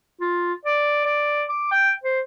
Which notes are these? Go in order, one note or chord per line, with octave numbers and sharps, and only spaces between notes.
F4
D5
D5
D6
G5
C5